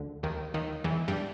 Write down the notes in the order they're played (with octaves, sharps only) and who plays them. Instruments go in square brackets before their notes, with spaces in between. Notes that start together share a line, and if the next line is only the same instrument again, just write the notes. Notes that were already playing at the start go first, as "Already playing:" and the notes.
Already playing: [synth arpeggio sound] D2 D3
D#2 D#3
D#2 D#3
E2 E3
G2 G3